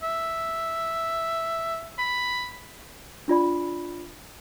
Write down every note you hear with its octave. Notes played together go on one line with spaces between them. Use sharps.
E5
B5
D4 F4 D5 B5